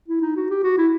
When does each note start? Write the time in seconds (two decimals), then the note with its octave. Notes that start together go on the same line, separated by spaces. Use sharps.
0.08 E4
0.22 D#4
0.36 F#4
0.50 G4
0.64 F#4
0.78 E4